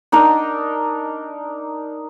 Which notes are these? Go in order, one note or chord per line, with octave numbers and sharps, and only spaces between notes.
D4 D#4 A#4 D#5